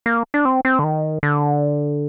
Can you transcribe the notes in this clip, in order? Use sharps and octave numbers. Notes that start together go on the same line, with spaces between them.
A#3
D4
C4
C4
D3
D#3
D3